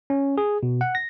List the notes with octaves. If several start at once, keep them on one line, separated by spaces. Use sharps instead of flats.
C#4
G#4
B2
F#5
A#6